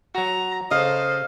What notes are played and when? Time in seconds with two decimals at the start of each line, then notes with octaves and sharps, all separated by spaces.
0.15 F#3 F#4 A#5
0.71 C#3 A4 C5 D#5 F5